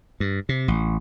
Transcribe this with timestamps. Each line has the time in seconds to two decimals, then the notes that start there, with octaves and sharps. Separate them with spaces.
0.20 G2
0.49 C3
0.68 A1